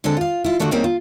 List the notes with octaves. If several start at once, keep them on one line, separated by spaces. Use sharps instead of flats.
D3 G#3 C4 D4 A4
F4 F5
E4 F4
D3 A3 D4 F4 F#4 A4
G3 A#3 C4 C#4 D#4 G#4
F4